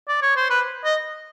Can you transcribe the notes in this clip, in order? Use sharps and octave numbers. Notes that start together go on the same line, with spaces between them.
D5
C#5
C5
B4
D#5